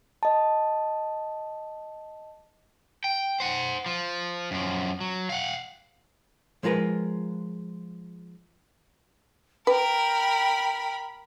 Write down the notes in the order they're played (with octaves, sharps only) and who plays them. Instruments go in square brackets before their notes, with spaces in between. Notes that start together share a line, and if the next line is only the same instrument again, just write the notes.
[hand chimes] D#5 A5
[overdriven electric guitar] G5
C5 F#5
F3
F#2 F3
F#3
F5 F#5
[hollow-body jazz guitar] F3 G#3 F4 A#4 B4
[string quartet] A#4 B5 [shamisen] B4 [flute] G5